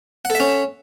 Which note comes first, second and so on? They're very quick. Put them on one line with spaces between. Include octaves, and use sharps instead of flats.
F#5 A4 E5 C#4